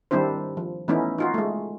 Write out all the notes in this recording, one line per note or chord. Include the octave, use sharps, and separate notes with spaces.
D#3 G3 C4 D4 E4 C5
F3
E3 A3 B3 C#4 D#4 E4
D#4 F4 F#4
G#3 A3